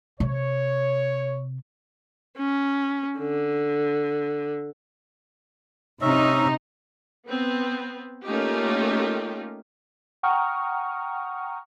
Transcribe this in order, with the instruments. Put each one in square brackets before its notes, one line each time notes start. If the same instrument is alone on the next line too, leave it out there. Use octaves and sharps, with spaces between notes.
[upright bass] C3 [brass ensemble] C#5
[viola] C#4
D3
[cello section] C3 D#4 [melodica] C#4 E5
[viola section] B3 C4
A3 A#3 C#4 D#4 F4 G4
[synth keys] F#5 G5 A#5 C#6 D#6 F6